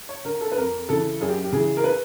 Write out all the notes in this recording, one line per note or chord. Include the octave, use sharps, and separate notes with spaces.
C#5
D3 A#4
A4
B4
F2 A#4
C#3 E3 A4
F#2 G#4
G4
G4
C#3 E3 G#4
A#4
B4